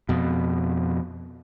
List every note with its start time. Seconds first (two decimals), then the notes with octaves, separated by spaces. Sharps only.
0.09 F2 B2